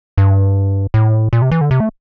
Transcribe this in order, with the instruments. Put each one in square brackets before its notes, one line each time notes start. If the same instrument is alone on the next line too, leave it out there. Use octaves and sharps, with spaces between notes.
[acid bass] G2
A2
A#2
C3
E3
D3
C3
A3